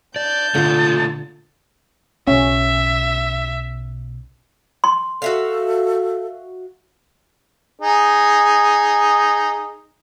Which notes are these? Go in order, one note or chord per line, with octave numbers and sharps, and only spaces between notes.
D5 A5 G6
A#2 D3 A3 F4
B1 C#4 E5
C6
F#4 A4 E5 F5
D#4 G#4